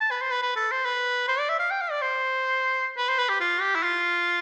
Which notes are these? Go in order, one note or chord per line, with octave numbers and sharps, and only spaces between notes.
A5
B4
C5
B4
B4
A4
C5
B4
C5
D5
E5
F5
G5
F5
D5
C5
B4
C5
B4
G4
F4
G4
E4
F4